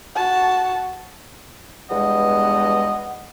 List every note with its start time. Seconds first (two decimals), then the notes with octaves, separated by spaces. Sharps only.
0.16 F#4 A5
1.90 E2 G2 B2 G#3 D#5 F#5